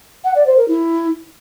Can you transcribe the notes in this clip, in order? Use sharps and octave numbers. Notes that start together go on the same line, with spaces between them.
F#5
D5
C5
A#4
E4